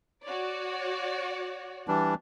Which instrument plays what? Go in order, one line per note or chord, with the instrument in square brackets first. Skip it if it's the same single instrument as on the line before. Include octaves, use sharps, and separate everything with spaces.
[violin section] F#4 C#5 D5
[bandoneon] E3 G3 D4